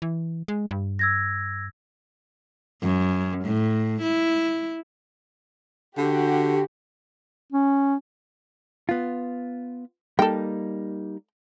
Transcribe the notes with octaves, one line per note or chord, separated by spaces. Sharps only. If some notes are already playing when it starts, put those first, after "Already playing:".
E3
G#3
G2
E6 G#6 A#6
F#2
A2
E4
D3 F#4 G4
C#4
B3 F4
G3 A#3 D#4 A4 G5